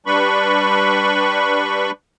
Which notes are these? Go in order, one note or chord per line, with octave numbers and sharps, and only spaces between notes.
G3 D4 B4 B5 C#6